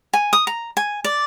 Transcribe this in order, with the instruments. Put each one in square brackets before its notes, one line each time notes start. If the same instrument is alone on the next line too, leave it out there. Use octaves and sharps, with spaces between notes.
[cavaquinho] G#5
D#6
A#5
G#5
D5